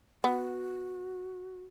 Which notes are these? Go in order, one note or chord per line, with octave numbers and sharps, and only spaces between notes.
B3 F#4